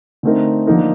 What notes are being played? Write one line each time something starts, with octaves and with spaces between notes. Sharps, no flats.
D3 A3 C4 D#4 A#4
D3 F3 A#3 D#4 A#4